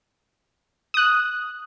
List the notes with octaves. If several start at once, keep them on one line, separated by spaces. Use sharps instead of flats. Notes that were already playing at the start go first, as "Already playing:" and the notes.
D#6 F#6